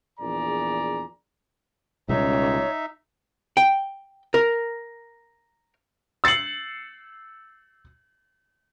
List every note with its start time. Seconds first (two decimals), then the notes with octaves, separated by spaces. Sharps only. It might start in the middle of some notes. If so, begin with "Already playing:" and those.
0.20 A#1 E2 G#4 D5 A#5
2.09 C#2 B2 G3 C#4 D#4 C#5 E5
3.57 G5
4.34 A#4
6.24 E6 A6 C7 C#7 F#7